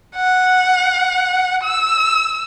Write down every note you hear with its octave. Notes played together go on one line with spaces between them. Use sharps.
F#5
E6